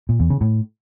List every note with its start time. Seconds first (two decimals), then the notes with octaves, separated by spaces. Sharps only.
0.09 A#2
0.20 E2
0.30 C#3
0.41 A2